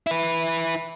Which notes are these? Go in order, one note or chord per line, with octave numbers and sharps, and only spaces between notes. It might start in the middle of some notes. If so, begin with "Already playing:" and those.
E4 B4